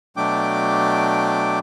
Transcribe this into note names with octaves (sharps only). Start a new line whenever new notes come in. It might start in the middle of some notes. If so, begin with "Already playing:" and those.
B2 F#3 A3 D4 G5 D6